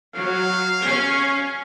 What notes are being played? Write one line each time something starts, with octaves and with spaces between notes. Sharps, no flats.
F#3 F5
C#4